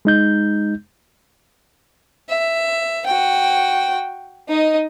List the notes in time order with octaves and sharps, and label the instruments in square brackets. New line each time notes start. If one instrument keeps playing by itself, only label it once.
[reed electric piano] G#3 D#4 G6
[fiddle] E5
F#4 G5
D#4 D#5